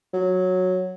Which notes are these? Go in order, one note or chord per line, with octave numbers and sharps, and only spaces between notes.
F#3